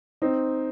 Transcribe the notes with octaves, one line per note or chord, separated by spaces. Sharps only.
C4 D#4